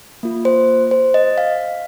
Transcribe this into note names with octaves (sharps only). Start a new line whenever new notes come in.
A#3 F4
C5
C5
D#5
F5